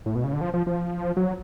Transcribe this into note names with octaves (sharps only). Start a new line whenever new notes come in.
A2
B2
C#3
D3
F3
F3
F3
F#3